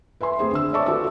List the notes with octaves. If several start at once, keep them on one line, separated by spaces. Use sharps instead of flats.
B4 E5 G#5 C6
A3 C4 G#4 C5
D3 E6
C#5 D5 E5 A5 C#6 D6
F4 F#4 A4 B4 A5 E6